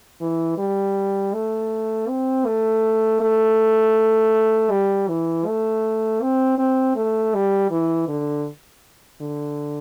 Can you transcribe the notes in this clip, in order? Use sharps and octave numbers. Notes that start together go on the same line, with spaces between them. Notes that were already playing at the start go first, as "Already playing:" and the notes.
E3
G3
A3
C4
A3
A3
G3
E3
A3
C4
C4
A3
G3
E3
D3
D3